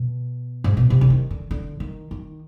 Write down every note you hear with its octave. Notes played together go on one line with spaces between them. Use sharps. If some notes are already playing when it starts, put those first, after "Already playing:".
Already playing: B2
G#2
B2
C3
D3
D#3
D3
D3
D#3
D#3